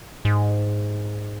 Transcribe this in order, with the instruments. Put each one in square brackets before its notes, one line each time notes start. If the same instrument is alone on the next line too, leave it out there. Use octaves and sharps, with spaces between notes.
[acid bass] G#2